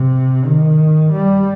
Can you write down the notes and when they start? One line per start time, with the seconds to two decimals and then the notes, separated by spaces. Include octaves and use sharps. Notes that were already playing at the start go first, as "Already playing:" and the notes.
Already playing: C3
0.46 D#3
1.12 G3